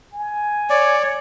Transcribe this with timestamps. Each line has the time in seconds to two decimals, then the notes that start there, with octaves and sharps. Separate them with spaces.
0.14 G#5
0.70 C#5 D5